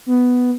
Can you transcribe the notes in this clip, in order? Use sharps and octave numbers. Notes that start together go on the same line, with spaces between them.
B3